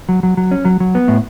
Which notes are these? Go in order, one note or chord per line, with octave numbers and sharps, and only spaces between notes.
F#3
F#3
F#3
C#4
F#3
F#3
B3
A2